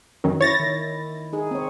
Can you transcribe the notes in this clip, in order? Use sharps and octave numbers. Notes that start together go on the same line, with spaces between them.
F#2 D#3
E4 C#5 A6 A#6
D#3
D#4 G#4
C4 C#5